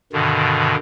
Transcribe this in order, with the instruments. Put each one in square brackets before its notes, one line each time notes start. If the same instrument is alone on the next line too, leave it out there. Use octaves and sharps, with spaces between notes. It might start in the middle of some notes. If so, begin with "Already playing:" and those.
[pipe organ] G2 B2 D3 D#3